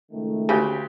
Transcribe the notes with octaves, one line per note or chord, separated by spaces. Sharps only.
C#2 D#3 A3
D2 C#3 G4